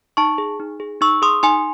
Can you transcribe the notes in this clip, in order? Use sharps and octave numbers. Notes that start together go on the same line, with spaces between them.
D#4 A5 C#6
G#4
D#4
G#4
D#4 C#6 E6
G#4 C6 D#6
D#4 G#5 C6